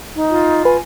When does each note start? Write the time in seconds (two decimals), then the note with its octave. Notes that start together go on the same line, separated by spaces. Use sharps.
0.16 D#4
0.30 F4
0.65 B4 G#5